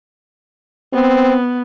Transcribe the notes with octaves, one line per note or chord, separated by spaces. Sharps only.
B3 C4